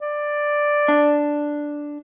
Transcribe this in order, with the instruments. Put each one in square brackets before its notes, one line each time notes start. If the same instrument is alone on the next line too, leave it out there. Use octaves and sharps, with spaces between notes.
[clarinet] D5
[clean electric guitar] D4